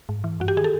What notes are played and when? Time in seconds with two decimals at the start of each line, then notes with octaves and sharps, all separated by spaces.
0.09 G#2
0.24 E3
0.40 G2 F#4
0.48 G4
0.57 D#3 G#4
0.64 A4